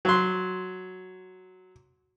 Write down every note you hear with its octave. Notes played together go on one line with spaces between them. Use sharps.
F#3 C6